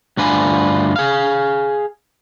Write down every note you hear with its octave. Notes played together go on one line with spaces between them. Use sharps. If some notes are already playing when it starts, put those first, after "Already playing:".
D2 G2 D4 F4 B4 G#5
G#4 F5